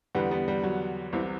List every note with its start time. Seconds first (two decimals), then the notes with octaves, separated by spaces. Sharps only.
0.15 E2 D3 G3 B3
0.31 G3 B3
0.48 G3
0.63 F#3
1.13 C2 C3 E3